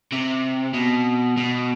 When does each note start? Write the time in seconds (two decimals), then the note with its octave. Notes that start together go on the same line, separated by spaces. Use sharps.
0.12 C3
0.74 B2
1.37 B2